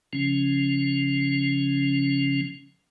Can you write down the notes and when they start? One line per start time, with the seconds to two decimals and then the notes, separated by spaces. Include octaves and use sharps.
0.13 C#3 F3 C#4